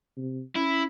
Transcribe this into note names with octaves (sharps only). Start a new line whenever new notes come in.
C3
C#4 E4